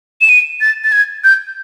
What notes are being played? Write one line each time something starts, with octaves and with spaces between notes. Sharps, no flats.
E7
D#7
A6
A6
G#6
G6